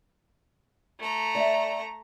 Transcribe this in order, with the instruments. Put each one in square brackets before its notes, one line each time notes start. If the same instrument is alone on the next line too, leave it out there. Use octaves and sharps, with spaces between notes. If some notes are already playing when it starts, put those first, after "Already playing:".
[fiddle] A3 A#5
[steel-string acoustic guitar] D5 E5 G5